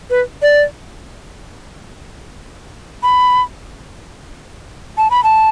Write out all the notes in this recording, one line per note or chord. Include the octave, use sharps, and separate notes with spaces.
B4
D5
B5
A5
B5
A5